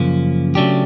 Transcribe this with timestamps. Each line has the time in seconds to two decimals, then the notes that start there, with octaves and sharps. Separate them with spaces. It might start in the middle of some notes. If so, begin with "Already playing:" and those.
Already playing: F#2 C#3 F3 A#3
0.55 C#3 F#3 A3 D4 G4